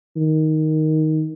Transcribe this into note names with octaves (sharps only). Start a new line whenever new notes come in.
D#3